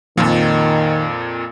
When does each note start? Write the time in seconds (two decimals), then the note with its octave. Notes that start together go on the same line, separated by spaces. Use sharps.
0.17 F2 A#2 D#3 F3